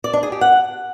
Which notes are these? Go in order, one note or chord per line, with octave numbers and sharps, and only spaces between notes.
D5
D4
G#4
G4
F#5